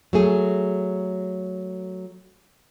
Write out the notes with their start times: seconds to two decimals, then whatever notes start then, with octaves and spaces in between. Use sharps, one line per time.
0.13 F#3 A3 G#4